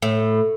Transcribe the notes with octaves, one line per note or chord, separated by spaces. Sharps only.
A2